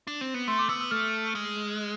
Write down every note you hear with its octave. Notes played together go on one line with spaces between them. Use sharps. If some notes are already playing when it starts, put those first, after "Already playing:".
D4
C4
B3
A3 C6
D6
B3 E6
E6
A3 F6
G#3